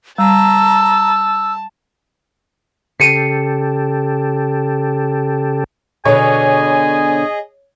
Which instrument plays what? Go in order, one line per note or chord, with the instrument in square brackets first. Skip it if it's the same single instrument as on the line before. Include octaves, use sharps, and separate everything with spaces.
[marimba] G3 [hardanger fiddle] A5 [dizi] A#5 [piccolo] E6
[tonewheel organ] C#3 G4 A4 [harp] C7 C#7 D#7
[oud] B2 D3 [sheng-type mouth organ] G#4 D#5 [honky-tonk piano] C#5 [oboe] G#5